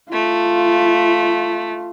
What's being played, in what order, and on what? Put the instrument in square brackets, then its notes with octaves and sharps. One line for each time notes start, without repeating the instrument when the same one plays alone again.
[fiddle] A3 [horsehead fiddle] F4